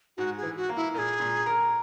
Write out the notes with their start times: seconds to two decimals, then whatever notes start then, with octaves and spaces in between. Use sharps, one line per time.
0.17 G#2 F#4
0.37 G#4
0.43 E3
0.56 F#4
0.69 A#3
0.76 E4
0.94 A#2 A#4
0.98 G#4
1.20 A#2
1.46 A#4